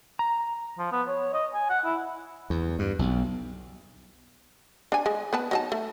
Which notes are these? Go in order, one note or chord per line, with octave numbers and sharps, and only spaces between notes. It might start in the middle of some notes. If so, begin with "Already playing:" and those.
A#5
F3
B3
C#5
D#5
G#5
F#5
E4
E2
G2
B1
D4 G#5
G#3
B3 B4 A5
F#3 D#4 A5
A3